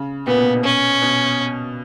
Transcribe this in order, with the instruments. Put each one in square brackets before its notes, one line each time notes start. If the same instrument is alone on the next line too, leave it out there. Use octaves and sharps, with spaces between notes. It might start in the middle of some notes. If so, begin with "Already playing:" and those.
Already playing: [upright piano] C#3
[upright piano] A#2 [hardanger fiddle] B3
[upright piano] B2
A#2
B2
[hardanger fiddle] C#4
[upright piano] B2